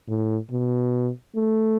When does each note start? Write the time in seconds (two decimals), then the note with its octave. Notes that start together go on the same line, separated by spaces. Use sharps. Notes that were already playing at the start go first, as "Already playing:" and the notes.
0.08 A2
0.51 B2
1.36 A3